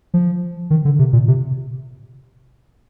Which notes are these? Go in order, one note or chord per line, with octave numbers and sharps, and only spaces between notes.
F3
D#3
D3
C3
A#2
C3